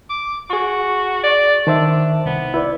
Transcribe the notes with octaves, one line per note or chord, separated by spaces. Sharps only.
D6
F#4 G#4 C#6
D5
D#3 D4 C5 E5
C2 B3
E4 B4 D5